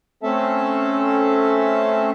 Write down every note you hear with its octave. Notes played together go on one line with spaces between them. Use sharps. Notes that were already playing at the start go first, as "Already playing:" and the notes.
A3 C4 C#4 A4 E5 A5